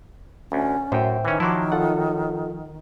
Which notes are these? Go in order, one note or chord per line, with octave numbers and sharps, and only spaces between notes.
D2 C#4
F#2 A2 C5 E5 G5
D#3 E3 C#4
F3 F#3 E4 A5 C6 D6
F4 A4 F#5